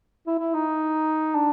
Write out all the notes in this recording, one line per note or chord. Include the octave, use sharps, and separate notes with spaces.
E4
E4
D#4
D4